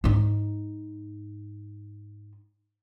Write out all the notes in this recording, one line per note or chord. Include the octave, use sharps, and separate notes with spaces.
G#2 D#4